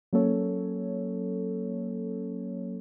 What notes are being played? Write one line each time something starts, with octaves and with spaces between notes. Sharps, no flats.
F#3 A#3 C#4 A4 C#5